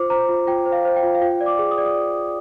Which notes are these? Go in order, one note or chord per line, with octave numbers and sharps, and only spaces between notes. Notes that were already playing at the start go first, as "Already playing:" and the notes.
Already playing: F4 C5 D6
C5 A#5
F4
F4 G5
C5
F5
C5
G5
F4
F5
F4 G5
D5
D6
G#4
D#6
D5
D#6